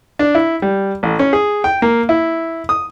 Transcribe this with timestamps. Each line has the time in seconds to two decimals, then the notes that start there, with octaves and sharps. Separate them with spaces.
0.19 D4
0.35 E4
0.62 G3
1.03 A1
1.19 C#4
1.33 G#4
1.64 G5
1.82 A#3
2.09 E4
2.69 D#6